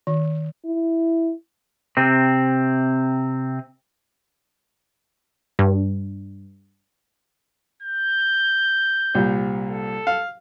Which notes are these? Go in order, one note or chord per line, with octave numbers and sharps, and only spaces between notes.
D#3
E4
C3 C4
G2
G6
C2 A#2
A4
F5